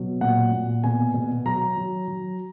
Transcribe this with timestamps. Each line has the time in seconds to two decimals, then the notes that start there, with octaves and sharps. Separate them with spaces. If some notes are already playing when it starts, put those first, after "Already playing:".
Already playing: B2 F#3
0.21 A#2 F#5
0.52 A#2
0.84 B2 G#5
1.14 B2
1.45 F#3 A#5
1.76 F#3
2.08 F#3